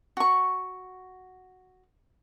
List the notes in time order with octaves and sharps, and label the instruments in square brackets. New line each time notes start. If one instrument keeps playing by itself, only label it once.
[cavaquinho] F#4 C#6